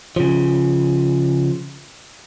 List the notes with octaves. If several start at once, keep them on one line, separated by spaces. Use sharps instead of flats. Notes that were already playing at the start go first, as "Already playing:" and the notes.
C#3 F3